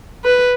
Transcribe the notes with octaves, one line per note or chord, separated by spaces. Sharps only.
B4